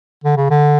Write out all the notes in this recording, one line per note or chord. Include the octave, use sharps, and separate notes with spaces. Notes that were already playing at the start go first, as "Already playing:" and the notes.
D3
C#3
D3